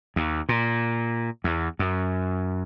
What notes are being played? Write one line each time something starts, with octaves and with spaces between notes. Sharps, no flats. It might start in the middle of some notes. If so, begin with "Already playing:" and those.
D#2
A#2
E2
F#2